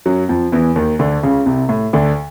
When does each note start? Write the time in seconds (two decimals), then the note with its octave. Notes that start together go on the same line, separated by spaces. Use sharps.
0.06 F#2 F#3
0.29 F2 F3
0.52 E2 E3
0.76 D#2 D#3
0.99 D2 D3
1.23 C#2 C#3
1.46 C2 C3
1.69 A2
1.93 D2 D3